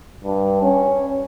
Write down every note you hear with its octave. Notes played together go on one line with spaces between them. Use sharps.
G2
C#4